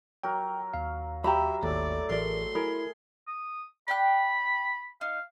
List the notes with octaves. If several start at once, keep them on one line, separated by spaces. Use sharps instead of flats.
F#3 A#4 G5
D#2 F5
F#3 G4 E5 A#5 B5
G#1 D#2 A2 D5
A1 G#4 A#4 D5 C6
E4 G#4 A#4 B5
D#6
D5 G5 B5 F#6
D#4 F5